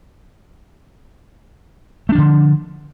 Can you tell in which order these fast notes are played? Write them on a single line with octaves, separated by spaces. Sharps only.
A3 D4 F3 D3